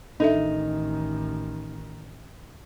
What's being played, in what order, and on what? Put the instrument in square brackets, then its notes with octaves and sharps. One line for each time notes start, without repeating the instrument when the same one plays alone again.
[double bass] A1 D#3 [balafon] D4 A4 E5 [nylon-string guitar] D#4